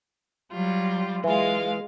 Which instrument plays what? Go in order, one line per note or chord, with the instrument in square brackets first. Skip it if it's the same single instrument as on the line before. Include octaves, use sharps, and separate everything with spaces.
[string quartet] F#3 G3 F4
[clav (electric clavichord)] E3 [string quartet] G#3 F4 F5